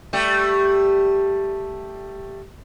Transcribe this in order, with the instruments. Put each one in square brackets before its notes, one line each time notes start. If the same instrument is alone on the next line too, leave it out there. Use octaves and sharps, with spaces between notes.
[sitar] G3 A3 G4